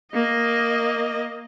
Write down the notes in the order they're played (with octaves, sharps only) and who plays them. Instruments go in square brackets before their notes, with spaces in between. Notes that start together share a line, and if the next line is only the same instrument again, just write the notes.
[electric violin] A#3 D#5